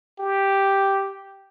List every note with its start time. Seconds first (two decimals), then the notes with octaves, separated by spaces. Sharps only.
0.20 G4